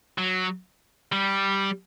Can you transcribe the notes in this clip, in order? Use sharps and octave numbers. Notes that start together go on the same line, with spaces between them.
F#3
G3